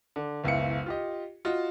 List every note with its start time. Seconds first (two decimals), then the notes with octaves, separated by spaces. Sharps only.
0.16 D3
0.44 F#1 C#2 B2 E4 C#7
0.86 F4 G4 D#5
1.45 F4 F#4 D#5